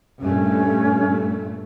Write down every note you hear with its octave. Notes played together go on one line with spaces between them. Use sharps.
G2 A#2 A3 C#4